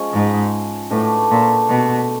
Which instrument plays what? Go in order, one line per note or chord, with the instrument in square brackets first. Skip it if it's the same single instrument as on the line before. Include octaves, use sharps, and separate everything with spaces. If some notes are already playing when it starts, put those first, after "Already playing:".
Already playing: [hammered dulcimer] F3 G#3 C#4
[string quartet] G#2
[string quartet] A2 [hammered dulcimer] A3 D4 F#4 B4
[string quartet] A#2
B2